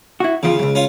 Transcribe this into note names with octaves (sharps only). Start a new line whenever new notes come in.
E4 F#4
E2 C#3 F3 F4
C#2 F#2
C#4 F4